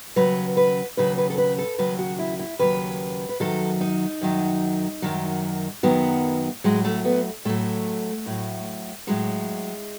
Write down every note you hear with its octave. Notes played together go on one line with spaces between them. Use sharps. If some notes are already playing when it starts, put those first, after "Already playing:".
D#2 C#3 F#3 B4
B4
D#2 C#3 F#3 B4
B4
A4
B4
A4
D#2 C#3 F#3 B4
F#4
E4
E4
D#2 C#3 F#3 B4
B4
F#2 D#3 F#3 A4
D#4
F#2 D#3 F#3
F#2 D#3 F#3
F#2 D#3 F#3 B3
A2 F#3 G#3
A3
B3
A2 F#3 A3
A2 F#3
A2 F#3 G#3